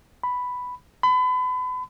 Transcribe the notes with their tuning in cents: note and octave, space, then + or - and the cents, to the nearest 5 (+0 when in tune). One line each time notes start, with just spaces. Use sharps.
B5 +5
B5 +35